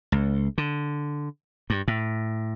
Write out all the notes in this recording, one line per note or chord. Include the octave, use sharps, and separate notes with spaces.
C#2
D3
G2
A2